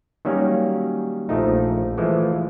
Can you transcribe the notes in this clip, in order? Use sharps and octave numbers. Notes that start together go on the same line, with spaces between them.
D#3 F#3 G3 A#3 C#4
A#1 D#3 F3 A3 D#4
E3 F3 G#3 A3